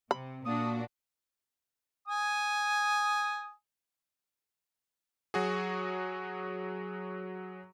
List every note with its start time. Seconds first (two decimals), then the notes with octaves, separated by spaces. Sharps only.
0.11 C3 B5
0.46 A#2 A#3 D4 F#4 D#6
2.08 G#5 D#6
5.34 F#3 F#4 G#4